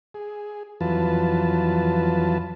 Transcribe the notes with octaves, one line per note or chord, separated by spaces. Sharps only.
G#4
F2 E3 F#3 F4 B4 A5